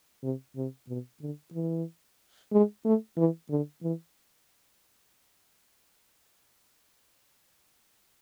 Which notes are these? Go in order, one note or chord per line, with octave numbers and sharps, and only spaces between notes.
C3
C3
B2
D3
E3
G#3
A3
E3
D3
E3